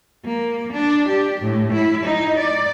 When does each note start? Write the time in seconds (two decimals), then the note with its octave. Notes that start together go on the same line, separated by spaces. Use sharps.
0.25 A#3
0.73 D4
1.09 G4
1.41 A2
1.73 E4
2.04 D#4
2.38 D5